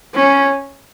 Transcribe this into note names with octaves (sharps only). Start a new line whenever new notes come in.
C#4